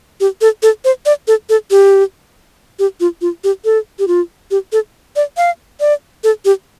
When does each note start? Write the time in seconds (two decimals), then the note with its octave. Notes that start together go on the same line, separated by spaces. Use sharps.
0.20 G4
0.41 A4
0.63 A4
0.85 C5
1.06 D5
1.28 A4
1.49 A4
1.71 G4
2.79 G4
3.00 F4
3.21 F4
3.44 G4
3.65 A4
3.99 G4
4.08 F4
4.51 G4
4.72 A4
5.16 D5
5.37 F5
5.80 D5
6.24 A4
6.45 G4